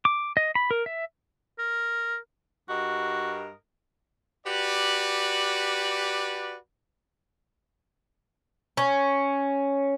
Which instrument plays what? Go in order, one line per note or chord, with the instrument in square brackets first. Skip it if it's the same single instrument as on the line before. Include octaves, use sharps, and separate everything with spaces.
[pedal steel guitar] D6
D#5
B5
A#4
E5
[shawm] A#4
[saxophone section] G2 A#4 D#5 [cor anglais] F#4
[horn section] F#4 G4 B4 D5
[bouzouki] C#4